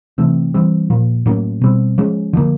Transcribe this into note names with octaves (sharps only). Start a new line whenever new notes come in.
C3 E3 A3 C4
E3 G3 C4
A#2 F3 A#3
A2 F#3 A#3 C#4
B2 G3 C4
F3 G#3 C#4
D3 F3 A#3